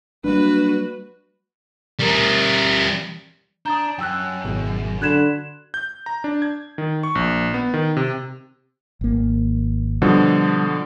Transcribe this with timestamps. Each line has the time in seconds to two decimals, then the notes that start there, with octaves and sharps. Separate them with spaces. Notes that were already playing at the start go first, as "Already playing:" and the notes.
0.24 F#3 G3 A#3 D4 F#4 B4
2.00 G3 A#4
3.66 D4 A5 A#5 D#6 G6
3.98 F#2 G5 E6 F#6
4.44 G#1 B2 G#4
5.02 D3 F#4 B5 C6 F#6 G#6 E7
5.74 G6
6.06 A#5
6.24 D4
6.42 G#6
6.78 D#3
7.03 C#6
7.15 A#1
7.54 B3
7.74 D#3
7.97 C3
9.01 G#1 A#3
10.02 B2 D3 F3 G3